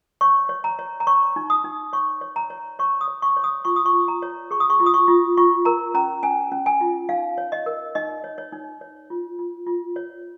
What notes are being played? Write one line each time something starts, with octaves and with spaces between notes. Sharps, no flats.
C#5 C#6
C#5
A#5
C#5
A#5
C#5 C#6
D#4
D#6
D#4
C#5 C#6
C#5
A#5
C#5
C#5 C#6
D#6
C#5
C#6
C#5
D#6
F4 C#6
D#6
C#6
F4
A#5
C#5
G#4 C#6
D#6
C#6
F4
D#6
C#6
F4
F4 C#6
A#4 A#5
C#4 A#5
C#4 G#5
C#4
G#5
F4
D#4 F5
C#5
D#5
A#4
D#4 D#5
C#5
C#5
D#4
C#5
F4
F4
F4
C#5